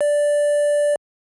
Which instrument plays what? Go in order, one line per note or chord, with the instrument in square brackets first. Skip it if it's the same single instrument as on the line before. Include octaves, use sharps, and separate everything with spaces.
[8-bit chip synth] D5